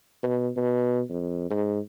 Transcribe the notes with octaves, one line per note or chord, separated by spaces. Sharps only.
B2
B2
F2
G#2